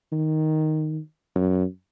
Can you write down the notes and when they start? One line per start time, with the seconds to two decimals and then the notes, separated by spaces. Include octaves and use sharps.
0.13 D#3
1.36 F#2